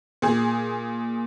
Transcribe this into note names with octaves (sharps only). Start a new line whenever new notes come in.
A#2 G#4